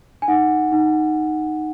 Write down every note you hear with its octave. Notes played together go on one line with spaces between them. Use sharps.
G#5
D#4 F#5
D#4